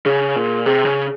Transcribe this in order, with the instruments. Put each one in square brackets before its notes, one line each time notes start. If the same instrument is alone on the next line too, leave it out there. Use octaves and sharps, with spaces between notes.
[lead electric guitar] C#3 [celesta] G#4
[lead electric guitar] A#2
[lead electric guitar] C3 [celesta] G#4
[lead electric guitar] C#3